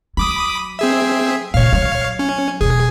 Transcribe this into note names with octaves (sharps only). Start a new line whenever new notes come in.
F#3 B5 D6 D#6
C4 G#4 E5
A#2 C#3 C#5 F5
F#3
C#4
E1 G#4